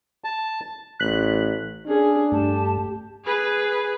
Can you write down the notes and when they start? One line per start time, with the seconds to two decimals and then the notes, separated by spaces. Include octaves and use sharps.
0.24 A5
1.00 A1 F#6 B6 F#7
1.86 C#4 D4 G#4
2.32 G2 A3 G4 A5
3.24 G#4 B4